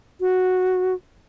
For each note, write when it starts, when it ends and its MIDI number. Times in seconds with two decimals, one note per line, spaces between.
0.21 0.94 66